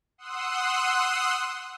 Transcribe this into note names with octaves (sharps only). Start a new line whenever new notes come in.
F#5 C6 D#6 E6 F#6